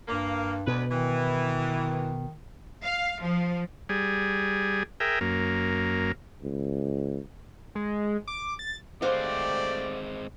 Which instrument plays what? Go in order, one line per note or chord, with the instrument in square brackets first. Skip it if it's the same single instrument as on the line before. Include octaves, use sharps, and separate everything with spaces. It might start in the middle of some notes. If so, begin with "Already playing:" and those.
[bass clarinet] G2 [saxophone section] A#3
[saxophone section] D2 B4 [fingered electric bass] B2
[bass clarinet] D#3 [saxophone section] E3
[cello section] F5
F3
[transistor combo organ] G3 G#4
G#4 A#4 E5 G5
F#2 A#3
[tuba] C#2
[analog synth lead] G#3
D6
A6
[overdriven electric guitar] G#3 C4 [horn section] A3 G4 D5 [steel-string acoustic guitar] C5 F5 F#5